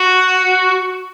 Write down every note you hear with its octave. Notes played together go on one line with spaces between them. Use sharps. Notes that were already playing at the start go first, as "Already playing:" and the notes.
Already playing: F#4